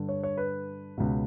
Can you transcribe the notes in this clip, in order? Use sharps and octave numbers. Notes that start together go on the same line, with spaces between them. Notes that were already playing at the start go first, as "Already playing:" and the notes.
Already playing: G2 D3
C#5
C#5
B4
C#2 B2